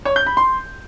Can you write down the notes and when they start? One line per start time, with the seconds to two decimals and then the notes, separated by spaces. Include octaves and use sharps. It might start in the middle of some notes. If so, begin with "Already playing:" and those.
0.05 C#5
0.16 G6
0.26 B5
0.37 C6